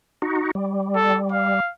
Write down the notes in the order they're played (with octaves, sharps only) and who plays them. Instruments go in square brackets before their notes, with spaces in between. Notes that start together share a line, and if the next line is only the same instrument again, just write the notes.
[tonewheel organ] D#4 F#4
G3
[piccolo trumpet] A4
F5